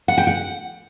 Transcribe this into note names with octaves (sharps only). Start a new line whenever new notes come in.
F#5
G5
F#5